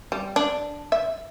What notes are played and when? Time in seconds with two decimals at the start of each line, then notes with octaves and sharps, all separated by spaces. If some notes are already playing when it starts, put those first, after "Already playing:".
0.12 G3
0.36 D4
0.92 E5